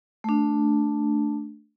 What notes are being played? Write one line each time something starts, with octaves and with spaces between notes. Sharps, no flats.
A3 D4